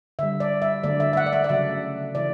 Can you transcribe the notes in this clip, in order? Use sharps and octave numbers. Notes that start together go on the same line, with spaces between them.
D3 G3 E5
D5
E5
D3 F#3 A3 D5
E5
E5
F#5
D5
E5
D5
C#3 F#3 A3 E5
C#3 E3 A3 D5